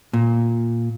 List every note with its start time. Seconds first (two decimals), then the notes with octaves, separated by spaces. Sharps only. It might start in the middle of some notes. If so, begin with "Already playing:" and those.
0.13 A#2